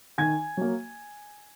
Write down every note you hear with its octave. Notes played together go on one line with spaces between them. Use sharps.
D#3 G#5 G#6
F#3 A#3